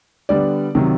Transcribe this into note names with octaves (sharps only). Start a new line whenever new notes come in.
D3 G3 B3 D5
C3 D#3 F#3